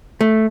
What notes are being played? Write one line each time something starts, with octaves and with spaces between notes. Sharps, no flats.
A3